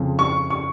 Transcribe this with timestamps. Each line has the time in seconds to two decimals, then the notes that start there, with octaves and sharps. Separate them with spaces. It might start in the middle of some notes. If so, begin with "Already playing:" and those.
Already playing: F2 C#3 F3
0.19 C#6
0.50 C#6